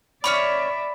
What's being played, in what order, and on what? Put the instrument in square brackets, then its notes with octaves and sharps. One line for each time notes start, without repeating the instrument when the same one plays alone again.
[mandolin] C#4 C#5 D6 [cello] D5 E5 [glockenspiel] B5